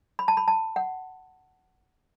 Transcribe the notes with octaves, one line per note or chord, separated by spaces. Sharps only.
B5
A5
B5
A5
F#5